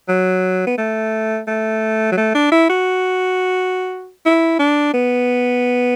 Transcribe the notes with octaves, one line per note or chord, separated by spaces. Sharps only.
F#3
B3
A3
A3
F#3
A3
D4
E4
F#4
E4
D4
B3